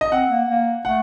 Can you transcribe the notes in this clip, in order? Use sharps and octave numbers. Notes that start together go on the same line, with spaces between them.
D#5
C4 F#5
A#3
A#3
A3 F#5